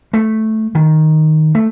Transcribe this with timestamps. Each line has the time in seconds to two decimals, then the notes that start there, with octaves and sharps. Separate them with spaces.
0.13 A3
0.75 D#3
1.55 A3